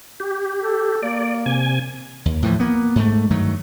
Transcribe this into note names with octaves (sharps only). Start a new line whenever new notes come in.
G4
A4
A#3 D5
C3 G#5
D#2
A2 E3 F3
A#3 B3
G#2 A3
G2 D#3 F#3 A3